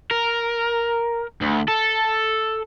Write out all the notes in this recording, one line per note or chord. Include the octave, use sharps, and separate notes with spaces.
A#4
D2
A4